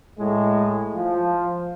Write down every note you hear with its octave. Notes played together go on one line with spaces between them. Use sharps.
A2 G#3
F3